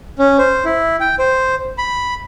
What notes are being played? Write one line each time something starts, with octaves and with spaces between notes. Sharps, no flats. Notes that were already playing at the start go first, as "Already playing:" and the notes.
C#4
C5
E4
G5
C5
B5